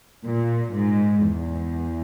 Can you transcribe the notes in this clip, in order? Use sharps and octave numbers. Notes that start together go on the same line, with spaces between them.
A#2
G#2
E2